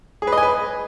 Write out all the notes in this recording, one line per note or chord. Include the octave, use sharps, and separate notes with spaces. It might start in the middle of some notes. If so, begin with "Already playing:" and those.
G#4
B4
D#5
G#5
B4